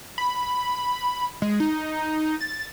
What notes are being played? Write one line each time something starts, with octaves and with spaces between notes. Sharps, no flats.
B5
G#3
D#4
A6